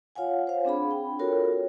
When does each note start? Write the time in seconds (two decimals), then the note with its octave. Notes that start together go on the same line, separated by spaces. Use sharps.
0.16 F4 C#5 F5 F#5 G#5
0.47 C5 F5
0.65 C4 D4 G#4 B5
0.91 G5
1.19 F4 F#4 A4 A#4 C#5